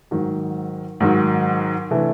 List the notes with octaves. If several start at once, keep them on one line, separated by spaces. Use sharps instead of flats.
G#2 D#3 F#3
G#2 D#3 F#3
C3 E3 A3 D4